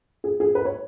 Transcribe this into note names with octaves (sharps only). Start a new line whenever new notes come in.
G#4
G#4
B4
C#5